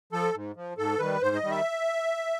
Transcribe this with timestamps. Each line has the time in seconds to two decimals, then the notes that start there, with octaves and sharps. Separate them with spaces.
0.13 F3 A4
0.34 G#2
0.56 F3
0.77 G#2 A4
0.99 D#3 G3 B4
1.21 G#2 C5
1.36 D#5
1.43 D#3 G3
1.51 E5